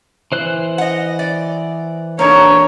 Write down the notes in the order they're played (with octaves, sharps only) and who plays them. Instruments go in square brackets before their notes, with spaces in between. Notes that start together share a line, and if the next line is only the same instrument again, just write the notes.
[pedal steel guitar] E3 C5 F#6
[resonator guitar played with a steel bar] D#5 F#5
D5
[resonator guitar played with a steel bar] A#3 D#4 A4 [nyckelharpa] D4 C#5